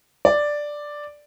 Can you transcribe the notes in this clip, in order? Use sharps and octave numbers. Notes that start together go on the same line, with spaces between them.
D5